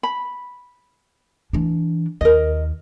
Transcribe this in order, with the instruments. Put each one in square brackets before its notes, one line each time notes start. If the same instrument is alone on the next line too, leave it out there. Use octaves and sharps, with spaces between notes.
[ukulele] B5
[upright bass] E3 D4
[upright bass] D#2 [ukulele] A#4 D#5